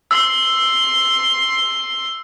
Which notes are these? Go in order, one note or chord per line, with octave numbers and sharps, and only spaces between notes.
C6 E6